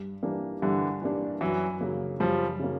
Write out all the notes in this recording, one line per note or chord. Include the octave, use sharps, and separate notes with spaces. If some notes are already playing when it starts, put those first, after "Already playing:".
Already playing: G2
E3 G3 A#3 D4
G2 D3 E3
E3 G3 A#3 D4
F#2 E3 F#3
C#3 F#3 A#3
F#2 F3 G3
C#3 F#3 A#3